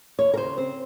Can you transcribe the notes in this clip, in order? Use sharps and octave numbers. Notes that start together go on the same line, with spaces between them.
D#2 C#5
A#4
C#3 C5
C4 C5